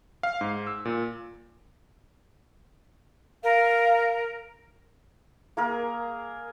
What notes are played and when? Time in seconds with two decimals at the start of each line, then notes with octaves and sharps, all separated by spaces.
0.23 F5
0.41 G#2
0.67 E6
0.85 A#2
3.44 A#4 F5
5.57 A#3 G#4 A#4